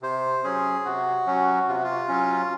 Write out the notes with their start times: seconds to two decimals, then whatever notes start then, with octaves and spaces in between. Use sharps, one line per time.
0.02 C3 C5
0.44 F#3 C#4 G#4
0.85 C3 F#4
1.26 F#3 C#4
1.68 C3 F4
1.75 F#4
1.83 F4
2.08 F#3 C#4